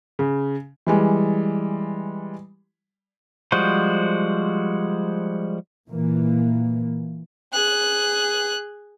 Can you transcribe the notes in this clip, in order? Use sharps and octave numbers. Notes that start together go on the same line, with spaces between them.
C#3
E3 G3 G#3
F3 G3 G#3 F#4 C5
A#2 E3 A#3
G#4 F#6